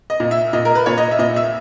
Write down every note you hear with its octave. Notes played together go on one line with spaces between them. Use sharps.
D#5
A#2
E5
A#2 D#5
A#4
B4
A#2 C#5
D#5
E5
A#2 D#5
E5